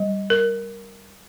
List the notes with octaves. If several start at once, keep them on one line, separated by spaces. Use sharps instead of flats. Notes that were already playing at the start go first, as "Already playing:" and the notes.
Already playing: G3
A#4